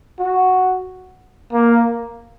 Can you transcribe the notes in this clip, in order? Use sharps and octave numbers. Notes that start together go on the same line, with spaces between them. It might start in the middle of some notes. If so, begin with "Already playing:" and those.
F#4
A#3